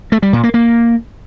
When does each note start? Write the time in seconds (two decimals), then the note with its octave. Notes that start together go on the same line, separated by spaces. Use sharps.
0.12 A3
0.22 G3
0.33 A#2
0.43 A#3
0.54 A#3